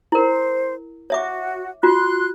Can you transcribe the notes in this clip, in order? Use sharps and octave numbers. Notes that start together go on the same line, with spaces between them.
E4 A#4 C5
F#4 C#5 E5 D6
F4 F#4 C6 F#6